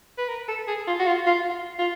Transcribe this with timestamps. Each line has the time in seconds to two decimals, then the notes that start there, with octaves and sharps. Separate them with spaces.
0.18 B4
0.29 A#4
0.48 A4
0.68 G#4
0.87 F4
0.99 F#4
1.07 F4
1.26 F4
1.79 F4